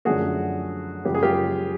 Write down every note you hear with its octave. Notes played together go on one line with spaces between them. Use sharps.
F#2 D3 F3 A3 F#4 G#4
F#2 C#3 F3 G#3 G4
G#4
F4 G4